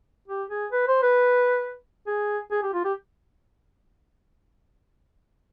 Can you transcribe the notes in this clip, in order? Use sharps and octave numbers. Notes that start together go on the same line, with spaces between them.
G4
G#4
B4
C5
B4
G#4
G#4
G4
F4
G4